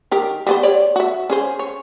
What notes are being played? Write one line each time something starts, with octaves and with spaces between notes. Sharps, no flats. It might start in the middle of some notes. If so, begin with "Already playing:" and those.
D#3 G4 A#4
G3 B3 C5
G4 C#5 D5
F#4 E5
C#4 G#4 C5
C#5